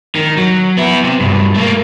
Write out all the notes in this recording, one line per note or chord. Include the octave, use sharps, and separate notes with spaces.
D#3
F#3
B3 E4
C3
G2 B2
A3 A#3